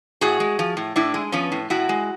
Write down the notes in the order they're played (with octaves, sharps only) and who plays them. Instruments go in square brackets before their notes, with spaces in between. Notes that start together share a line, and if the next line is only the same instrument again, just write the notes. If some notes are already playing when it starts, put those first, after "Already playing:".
[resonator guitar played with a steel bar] A2 F#4 G#4
G#3
F3
A2
A2 D4 E4
G#3
F3 B3 C#4
A2
A2 E4 F#4
G#3